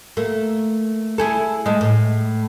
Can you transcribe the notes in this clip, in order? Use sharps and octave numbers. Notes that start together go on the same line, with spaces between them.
A3 A#3
E4 G#4 A4
G#3 A3
A2